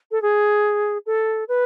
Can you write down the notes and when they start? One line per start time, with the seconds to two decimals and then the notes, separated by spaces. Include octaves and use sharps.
0.11 A4
0.22 G#4
1.06 A4
1.48 B4